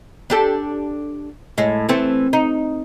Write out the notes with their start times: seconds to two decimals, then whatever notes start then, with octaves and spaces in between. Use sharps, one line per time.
0.30 D4 G4 A4
1.58 A2 G#3
1.89 E3 A3 C4
2.33 D#4